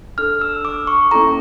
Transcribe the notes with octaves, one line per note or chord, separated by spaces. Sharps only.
D4 A4 F6
E6
D6
C#6
A#3 C#4 E4 A4 A#5